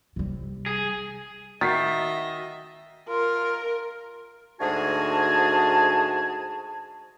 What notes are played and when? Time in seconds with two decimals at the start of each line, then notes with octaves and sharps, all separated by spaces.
0.16 C3 G3
0.66 G#4
1.61 D#3 F#4 D#5 E5 A6 B6 C7
3.09 F4 A#4
4.60 D2 G#2 F#4 G#4 G#5 A5